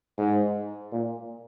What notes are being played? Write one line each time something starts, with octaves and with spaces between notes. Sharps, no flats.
G#2
A#2